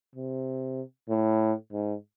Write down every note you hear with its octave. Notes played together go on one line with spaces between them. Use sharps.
C3
A2
G#2